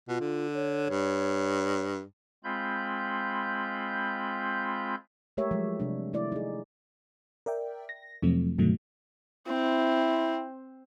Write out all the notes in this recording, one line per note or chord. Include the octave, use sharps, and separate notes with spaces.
B2 F4
D3
C#5
G2
G#3 C4 F4 B5 G6
G#3 A3 G4 A#4 C#5 E5
F3 F#3 G#3
C3 G3 D4
D#3 A3 E4 D5
D#4 G#4
A#4 D5 E5 G5
A#6
F2 C3 F3 F#3 A3 C4
G2 B2 D3 D#3 F#3 A3
C4 E4